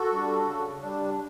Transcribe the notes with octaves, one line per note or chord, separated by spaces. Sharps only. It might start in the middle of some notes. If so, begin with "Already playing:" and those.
Already playing: F#4 A4
G3 D4
C#3
G3 D4